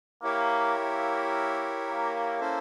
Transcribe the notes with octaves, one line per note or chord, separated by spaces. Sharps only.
A#3 E4 G4 A#4 C#5 E5
A#3
A#3
C#4 E4 A4 C5 E5